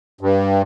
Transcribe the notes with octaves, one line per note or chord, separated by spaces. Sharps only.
G2